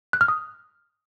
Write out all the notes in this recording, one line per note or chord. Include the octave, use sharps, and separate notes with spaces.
F#6
F6
D#6